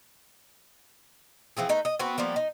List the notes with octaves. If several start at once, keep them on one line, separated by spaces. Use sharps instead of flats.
E3 F3 C4 G#4
A3 D#4 B4
D#5
B3 C4 F#4 B4
F3 G3 A#3 B3
D#4